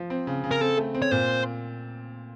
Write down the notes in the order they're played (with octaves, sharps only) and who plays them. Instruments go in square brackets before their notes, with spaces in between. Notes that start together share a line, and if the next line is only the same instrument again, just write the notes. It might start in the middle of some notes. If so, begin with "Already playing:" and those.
Already playing: [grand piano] F3
C4
C#3
C#3
[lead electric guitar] A#4
[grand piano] C4 [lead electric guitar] A4
[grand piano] A3
C4
[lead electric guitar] C#5
[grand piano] A#2 [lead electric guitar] C5